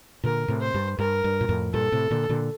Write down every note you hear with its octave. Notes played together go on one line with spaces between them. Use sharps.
A#2 D3 A#4
A2 C3
C5
G2
G2 A#4
G2
A#2
F2 A2
G2 A#2 A4
A2 C3
A#2 D3
A#2 D3